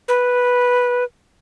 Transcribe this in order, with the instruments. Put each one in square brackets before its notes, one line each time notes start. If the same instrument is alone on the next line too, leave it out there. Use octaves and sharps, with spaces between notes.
[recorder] B4